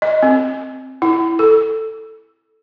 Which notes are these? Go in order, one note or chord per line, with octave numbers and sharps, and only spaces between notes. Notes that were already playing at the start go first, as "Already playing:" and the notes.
D#5
C4
E4
A4